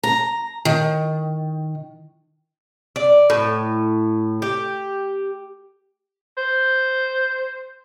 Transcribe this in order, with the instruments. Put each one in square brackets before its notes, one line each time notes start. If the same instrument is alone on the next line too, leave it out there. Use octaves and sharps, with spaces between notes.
[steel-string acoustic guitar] A#5
D#3
[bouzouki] D5
A2
G4
[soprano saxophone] C5